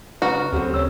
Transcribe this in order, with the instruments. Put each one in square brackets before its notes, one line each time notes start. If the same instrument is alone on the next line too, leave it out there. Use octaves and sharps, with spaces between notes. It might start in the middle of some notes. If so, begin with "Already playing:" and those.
[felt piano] C#3 [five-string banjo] F#4 [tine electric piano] B4 A#5 F6
[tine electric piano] D2 G4 A4 [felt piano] C#3 F#3 C4
[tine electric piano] C#5 E6